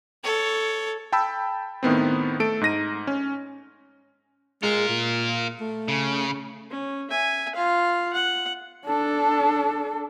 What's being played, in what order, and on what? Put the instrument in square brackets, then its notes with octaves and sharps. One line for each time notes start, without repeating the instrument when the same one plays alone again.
[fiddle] A4 C#5
[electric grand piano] G5 A5 B5 E6
A2 D#3 B3 C4
A3 A4 D7
G#2 D#4 A#6 D#7
C#4
[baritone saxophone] G#3 [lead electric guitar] F4 A#4
[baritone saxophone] A#2
A3
[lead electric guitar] C#3
[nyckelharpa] C#4
E5 G#5
F4 F5
F#5
[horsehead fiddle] D4 A4